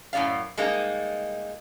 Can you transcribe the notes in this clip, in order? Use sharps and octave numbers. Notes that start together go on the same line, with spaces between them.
F#2 A2 B3 D5 F5
G3 G#3 A#3 D#4